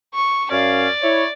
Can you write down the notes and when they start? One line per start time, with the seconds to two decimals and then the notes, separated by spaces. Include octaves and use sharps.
0.14 C#6
0.51 F#2 C#4 D5 F5
1.03 E4 C#5